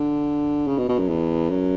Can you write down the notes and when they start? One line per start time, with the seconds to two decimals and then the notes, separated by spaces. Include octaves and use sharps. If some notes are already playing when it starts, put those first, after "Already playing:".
Already playing: D3
0.67 C#3
0.78 B2
0.89 B2
0.99 F#2
1.08 E2
1.50 F#2